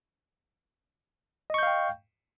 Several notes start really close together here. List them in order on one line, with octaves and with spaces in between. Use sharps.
D#5 C#6 G6 F5 G5